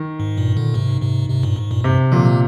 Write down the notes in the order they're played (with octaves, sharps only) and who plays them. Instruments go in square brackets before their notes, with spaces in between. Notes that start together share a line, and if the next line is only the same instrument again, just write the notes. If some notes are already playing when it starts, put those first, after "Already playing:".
Already playing: [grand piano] D#3
[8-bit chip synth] G#2
G2 A#2
A#2 D3
G#2 C3
G#2 C3
G#2 C3
G2 A#2
G#2
G2 A#2
[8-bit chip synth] G2 [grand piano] C3
[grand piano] A#2 [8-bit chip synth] D3 F3
[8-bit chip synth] C3 D#3